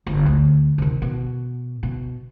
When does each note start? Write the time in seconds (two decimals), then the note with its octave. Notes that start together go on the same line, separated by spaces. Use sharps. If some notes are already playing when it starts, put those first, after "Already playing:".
0.06 G1
0.26 D2
0.78 C3 D#3
1.02 B2
1.83 B2